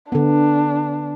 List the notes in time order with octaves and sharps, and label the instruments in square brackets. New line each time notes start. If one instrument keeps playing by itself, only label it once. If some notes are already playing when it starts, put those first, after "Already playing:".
[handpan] D3 B3 [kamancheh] D4